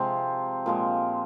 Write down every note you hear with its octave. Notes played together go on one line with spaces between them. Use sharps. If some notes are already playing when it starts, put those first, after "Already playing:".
Already playing: C3 F3 G#3 C4
A#2 F3 G#3